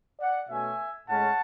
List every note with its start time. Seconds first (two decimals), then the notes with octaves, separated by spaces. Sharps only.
0.20 D5 F#5
0.50 B2 A3 C#4 E5 G#5
1.09 A2 G#3 C#4 F#5 A5